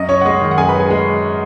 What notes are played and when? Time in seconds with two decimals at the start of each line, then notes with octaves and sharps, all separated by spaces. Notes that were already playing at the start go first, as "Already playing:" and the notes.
Already playing: F#2 D#5
0.09 C#4 C#5
0.21 F#5
0.25 G#3 D#5
0.41 D#3
0.51 F#5
0.58 F#2 G#4 G#5
0.69 B4 B5
0.74 C#4
0.79 G#4 G#5
0.90 G#3